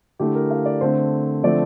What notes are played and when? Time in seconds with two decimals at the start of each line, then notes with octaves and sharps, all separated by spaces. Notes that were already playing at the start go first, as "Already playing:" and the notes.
0.19 D3 A3 E4 G4
0.35 A#4
0.51 F5
0.66 D5
0.81 D3 A3 C4 C5
1.43 D3 F3 A3 C4 D5